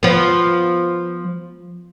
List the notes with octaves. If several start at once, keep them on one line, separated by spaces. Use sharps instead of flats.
F3 B3